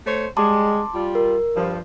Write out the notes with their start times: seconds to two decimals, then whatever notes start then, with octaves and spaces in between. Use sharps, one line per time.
0.06 A3 C5 C#5
0.37 G3 G#3 A5 C6 D6
0.94 G3 F4
1.15 A#4
1.55 G2 F3